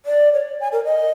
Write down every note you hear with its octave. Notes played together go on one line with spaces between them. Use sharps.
D5
C#5
G#5
A#4
D#5